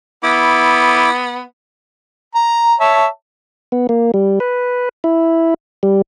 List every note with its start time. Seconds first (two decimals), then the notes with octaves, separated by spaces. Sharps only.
0.23 B3 E4 D6
2.35 A#5
2.80 C#5 E5 A5
3.72 B3
3.89 A#3
4.14 G3
4.40 B4
5.04 E4
5.83 G3